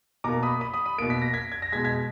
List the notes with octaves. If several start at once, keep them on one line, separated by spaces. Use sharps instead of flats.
B2 A#3 A#5 D6
B5 D#6
B5 D#6
B5 D#6
B5 D#6
B2 A#3 D7
B6
A#6
G#6 B6
G#6
A#6
B2 G#3 G#6 B6
G#6 B6